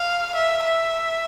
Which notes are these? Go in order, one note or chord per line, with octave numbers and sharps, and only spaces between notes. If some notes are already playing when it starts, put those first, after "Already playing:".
Already playing: F5
E5
E5